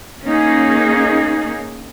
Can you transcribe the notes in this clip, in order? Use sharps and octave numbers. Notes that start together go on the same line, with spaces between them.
A#3 C#4 D#4 G#4